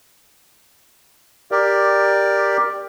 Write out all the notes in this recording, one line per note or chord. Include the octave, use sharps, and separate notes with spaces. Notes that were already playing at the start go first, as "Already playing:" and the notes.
G4 A#4 D5